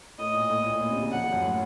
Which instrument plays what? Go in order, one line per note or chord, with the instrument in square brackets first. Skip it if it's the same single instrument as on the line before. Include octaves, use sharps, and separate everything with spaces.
[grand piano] A2 [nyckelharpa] D#5
[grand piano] A#2
A2
A#2
A2
A#2
C3
C#3
[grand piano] F3 [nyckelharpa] F#5
[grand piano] F3
F#2
A2